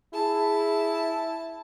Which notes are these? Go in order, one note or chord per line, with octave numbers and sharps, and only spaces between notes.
E4 G#4 A5